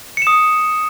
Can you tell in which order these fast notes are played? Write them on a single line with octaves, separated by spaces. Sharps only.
C#7 E7 D#6